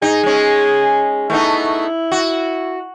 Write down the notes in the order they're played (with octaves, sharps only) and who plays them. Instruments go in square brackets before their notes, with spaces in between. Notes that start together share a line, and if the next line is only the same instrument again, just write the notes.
[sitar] D#4 [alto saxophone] G#4
[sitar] G#3 C#4
[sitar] A3 B3 D#4 [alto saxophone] E4
[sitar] F#4